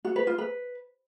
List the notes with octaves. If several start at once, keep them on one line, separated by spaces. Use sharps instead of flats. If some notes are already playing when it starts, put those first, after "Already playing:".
F#4
B4
F4
B4